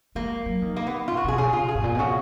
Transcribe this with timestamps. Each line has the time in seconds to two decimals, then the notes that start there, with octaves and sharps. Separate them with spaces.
0.15 G#3 A#3
0.46 F#3
0.62 D#3
0.77 A#3
0.87 B3
1.08 F4
1.12 A#2
1.17 F#4
1.25 B2 G#4
1.38 C#3 G#4
1.53 F4
1.68 G#4
1.75 G#2
1.84 A#2
1.95 B2
1.99 C#3 F#4